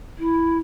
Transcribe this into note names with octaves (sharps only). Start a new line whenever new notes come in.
E4